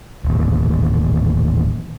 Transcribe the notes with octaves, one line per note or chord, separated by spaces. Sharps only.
D#1 A1 D#2